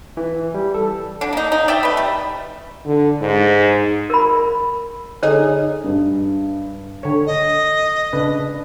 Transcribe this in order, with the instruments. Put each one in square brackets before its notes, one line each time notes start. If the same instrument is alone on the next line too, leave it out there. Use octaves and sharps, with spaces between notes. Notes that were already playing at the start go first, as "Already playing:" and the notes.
[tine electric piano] E3
G3
A4
[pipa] D3 D4
A#3 D#4
D#4
D5 E5 G5
A3 B4
G3
[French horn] D3
G#2
[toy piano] A#4 B5
[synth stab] D3 D#4 G#4 [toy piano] C#5
[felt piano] G2
[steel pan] D3 C#5
[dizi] D#5
[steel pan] C#3 D4 B4